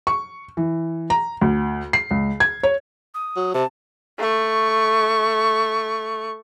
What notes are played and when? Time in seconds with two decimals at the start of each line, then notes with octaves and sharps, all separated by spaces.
0.07 C#6
0.57 E3
1.10 A#5
1.41 D2
1.93 C7
2.11 C#2
2.40 G#6
2.63 C#5
3.14 D#6
3.36 F#3
3.54 C3 A5
4.19 A3 C#6